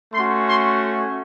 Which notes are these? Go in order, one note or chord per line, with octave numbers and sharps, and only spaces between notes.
A3 C#4 F#4 C6
C6